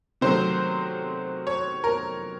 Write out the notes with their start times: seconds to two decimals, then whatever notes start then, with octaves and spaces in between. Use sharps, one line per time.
0.21 C3 D#3 F#3 A3 C5
1.47 C#5
1.84 A#4